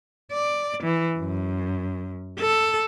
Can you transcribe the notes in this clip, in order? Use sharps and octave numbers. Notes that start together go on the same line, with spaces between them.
D5
E3
F#2
A4